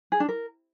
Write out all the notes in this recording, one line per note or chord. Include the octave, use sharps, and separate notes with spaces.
G#4
D4
A#4